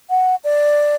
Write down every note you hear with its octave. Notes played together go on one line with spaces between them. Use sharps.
F#5
D5